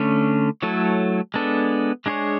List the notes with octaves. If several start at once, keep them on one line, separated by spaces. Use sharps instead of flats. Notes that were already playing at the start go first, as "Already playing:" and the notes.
Already playing: D3 A3 C#4
F#3 A3 E4 A4 C#5
G#3 B3 D4 A4
G#3 D4 G#4 C#5